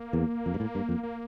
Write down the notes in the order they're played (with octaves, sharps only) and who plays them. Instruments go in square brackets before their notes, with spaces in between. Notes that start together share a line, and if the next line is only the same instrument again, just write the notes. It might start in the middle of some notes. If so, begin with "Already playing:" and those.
Already playing: [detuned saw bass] A#3
[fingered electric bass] E2
F2
G2
A2
G2
F2
[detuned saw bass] A#3